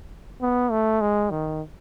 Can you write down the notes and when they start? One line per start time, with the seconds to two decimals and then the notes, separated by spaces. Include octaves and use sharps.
0.42 B3
0.71 A3
1.01 G#3
1.30 D#3